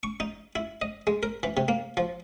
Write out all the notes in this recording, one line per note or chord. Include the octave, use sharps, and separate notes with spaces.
C#6
D#4
E4
D#5
G#3
A#4
E3
C3
A#3
F3